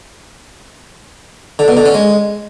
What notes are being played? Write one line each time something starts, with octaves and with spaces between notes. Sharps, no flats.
D3
B2
D3
C#4
G#3